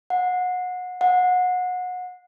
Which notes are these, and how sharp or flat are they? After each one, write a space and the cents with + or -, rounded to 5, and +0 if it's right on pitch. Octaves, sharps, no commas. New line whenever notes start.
F#5 -25
F#5 -25